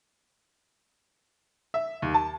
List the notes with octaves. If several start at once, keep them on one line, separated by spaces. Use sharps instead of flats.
E5
D#2
A5